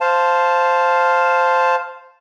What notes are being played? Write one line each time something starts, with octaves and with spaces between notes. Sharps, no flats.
C5 F5 A5